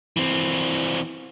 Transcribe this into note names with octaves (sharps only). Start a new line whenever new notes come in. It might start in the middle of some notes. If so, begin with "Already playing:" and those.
E3 C4